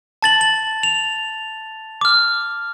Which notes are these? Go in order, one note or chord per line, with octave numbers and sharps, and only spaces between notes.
A5 A6 F#7
F#7
F7
D6 F6